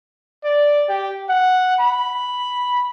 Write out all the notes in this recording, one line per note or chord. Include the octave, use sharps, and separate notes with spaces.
D5
G4
F#5
B5